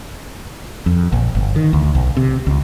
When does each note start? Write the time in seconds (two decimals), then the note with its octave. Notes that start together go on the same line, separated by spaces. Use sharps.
0.86 F2
1.12 A#1
1.35 G1
1.56 D#3
1.73 D2
1.95 B1
2.17 C3
2.47 C#2